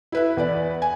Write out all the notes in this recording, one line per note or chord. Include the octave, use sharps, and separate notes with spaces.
E4 B4 E5
E2 B4 D5
G#5